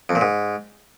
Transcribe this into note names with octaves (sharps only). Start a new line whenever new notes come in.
F2
A#2
G#2